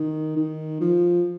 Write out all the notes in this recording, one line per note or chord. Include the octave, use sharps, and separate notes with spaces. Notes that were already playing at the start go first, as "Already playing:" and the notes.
Already playing: D#3
D#3
F3